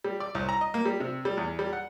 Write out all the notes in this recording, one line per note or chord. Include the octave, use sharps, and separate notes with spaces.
G3
D5
C2
A#5
D#5
A#3
G3
C3
G3
E2
G3
F#5